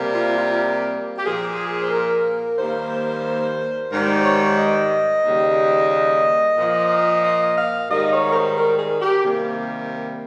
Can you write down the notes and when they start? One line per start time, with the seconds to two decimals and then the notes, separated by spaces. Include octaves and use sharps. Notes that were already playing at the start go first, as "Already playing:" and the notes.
Already playing: C3 G3 A#3
0.14 F4
0.36 F4
1.17 G4
1.25 A#2 F3 A#3 G#4
1.81 C5
1.91 A#4
2.57 D#2 D#3 G3 A#3 C5
3.91 G#2 D#3 G3 A#4
4.07 C5
4.24 C#5
4.57 D#5
5.24 D#2 C#3 G3
6.57 A#2 F3 A#3
7.23 D#5
7.56 F5
7.89 G#2 D#3 G3 D#5
8.12 C#5
8.29 A#4
8.34 C5
8.57 A#4
8.78 G#4
9.01 G4
9.23 C3 D#3 G3 A#3